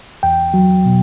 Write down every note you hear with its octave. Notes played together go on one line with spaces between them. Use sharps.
E2 G5
F#3
B2